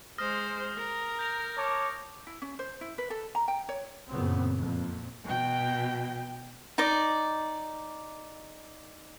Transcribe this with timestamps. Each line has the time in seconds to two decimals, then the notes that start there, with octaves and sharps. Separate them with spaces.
0.18 G#3 C5 D#6 F6 A#6
0.77 A#4
1.19 G6 A#6 F7
1.58 C#5 A5 D6
2.27 E4
2.42 C#4
2.59 C5
2.81 E4
2.98 B4
3.10 A4
3.35 A#5
3.48 G5
3.69 C#5
4.10 F#2 A#2 C#3 B3 C4
4.59 F2 A#2
5.25 B2 G5
6.78 D#4 D5